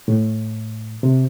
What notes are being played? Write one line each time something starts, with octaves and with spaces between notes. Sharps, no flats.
A2
C3